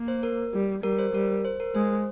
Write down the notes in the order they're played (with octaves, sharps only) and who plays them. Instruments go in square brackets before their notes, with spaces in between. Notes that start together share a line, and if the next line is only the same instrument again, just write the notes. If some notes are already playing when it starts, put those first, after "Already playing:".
Already playing: [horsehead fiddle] A#3
[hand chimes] C5
A#4
[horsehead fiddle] G3
[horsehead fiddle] G3 [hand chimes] A#4
[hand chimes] C5
[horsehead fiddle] G3 [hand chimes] A#4
[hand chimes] C5
A#4
[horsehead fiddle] G#3 [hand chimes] C5